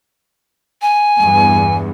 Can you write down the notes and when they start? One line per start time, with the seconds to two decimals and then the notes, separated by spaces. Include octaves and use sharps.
0.82 G#5
1.19 E2 G2